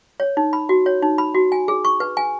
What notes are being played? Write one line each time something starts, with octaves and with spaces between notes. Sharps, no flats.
C#5
D#4
B5
F#4
C#5
D#4
B5
F#4
G#5
G#4
C#6
B4
G#5